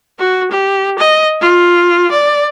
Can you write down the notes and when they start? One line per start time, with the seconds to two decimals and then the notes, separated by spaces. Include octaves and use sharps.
0.19 F#4
0.51 G4
0.98 D#5
1.41 F4
2.11 D5